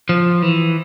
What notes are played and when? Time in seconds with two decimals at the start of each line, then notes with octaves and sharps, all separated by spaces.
0.09 F3
0.42 E3